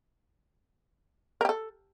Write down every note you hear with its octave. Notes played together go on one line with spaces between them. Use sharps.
G4 A4 A#4